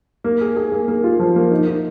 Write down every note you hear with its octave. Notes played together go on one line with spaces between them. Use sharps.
A#3
G#4
G#4
A#3
A#3
F4
F3
A#3
D#4
D#4